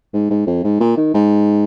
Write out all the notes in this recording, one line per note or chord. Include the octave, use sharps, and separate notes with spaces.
G#2
G#2
F2
G#2
A#2
D#3
G#2